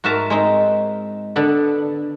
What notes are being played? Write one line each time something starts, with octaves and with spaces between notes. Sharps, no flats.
G#2 F#4 A#4 E5 A5 A#5
G#3 C4 D#4
D3 B3 A4